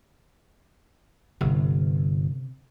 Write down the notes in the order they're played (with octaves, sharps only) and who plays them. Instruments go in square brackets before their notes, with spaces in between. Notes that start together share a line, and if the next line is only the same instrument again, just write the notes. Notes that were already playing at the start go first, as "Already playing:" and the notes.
[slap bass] G1 [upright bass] C3